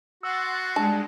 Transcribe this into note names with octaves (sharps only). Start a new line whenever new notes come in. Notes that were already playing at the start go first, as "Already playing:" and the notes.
F#4 F#5 C6 E6 A6
G3 G#3 D4 A5